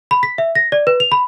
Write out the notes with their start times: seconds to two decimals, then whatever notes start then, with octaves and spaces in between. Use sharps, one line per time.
0.11 B5
0.23 B6
0.38 E5
0.55 A#6
0.72 D5
0.87 B4
1.00 F7
1.12 B5